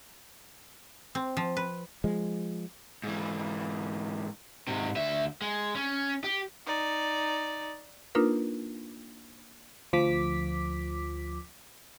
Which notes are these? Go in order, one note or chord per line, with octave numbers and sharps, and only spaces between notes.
C4
F3
B4
F3 G#3
G#2 E3
G#2 C3
D2 E5
G#3
C#4
G4
D#4 D5
A#3 D4 D#4 F4 A#4 B4
D2 F3 D6 B6